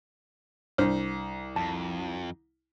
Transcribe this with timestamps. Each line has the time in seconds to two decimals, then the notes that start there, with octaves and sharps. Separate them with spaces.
0.78 C2 D4 C5 F6
1.56 F2 A5